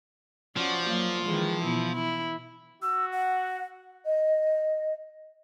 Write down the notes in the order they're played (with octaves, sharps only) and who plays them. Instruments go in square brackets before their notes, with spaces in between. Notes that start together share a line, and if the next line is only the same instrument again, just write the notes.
[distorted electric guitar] F3 [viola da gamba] C#4 F#4 D5
[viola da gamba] F#3 A#3
D#3 E3 G#3
B2 E4
E4
[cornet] F#4 [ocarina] E6
[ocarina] F#5
[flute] D#5